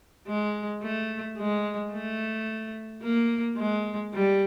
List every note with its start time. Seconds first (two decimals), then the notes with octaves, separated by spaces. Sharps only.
0.27 G#3
0.82 A3
1.38 G#3
1.93 A3
3.03 A#3
3.58 G#3
4.13 G3